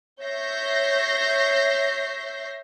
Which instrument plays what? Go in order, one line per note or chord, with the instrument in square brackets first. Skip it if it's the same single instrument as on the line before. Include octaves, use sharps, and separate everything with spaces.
[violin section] C#5 E5 G6 A#6 C7